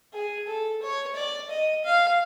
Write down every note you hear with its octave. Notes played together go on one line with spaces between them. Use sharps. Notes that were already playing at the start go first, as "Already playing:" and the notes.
G#4
A4
C#5
D5
D#5
F5